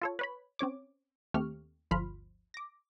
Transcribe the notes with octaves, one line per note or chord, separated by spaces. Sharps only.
F4 A4 C#5
B4 C#5 B5
C4 C#4 C#5 D6
D#2 A3 C4 G4 C#6 F6
G1 D2 F3 B5 C6 F6
D6 A#6